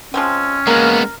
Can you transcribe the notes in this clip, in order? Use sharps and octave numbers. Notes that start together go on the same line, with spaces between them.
F3 G#3 C4 C#4
G#3 A#3 B3 A#4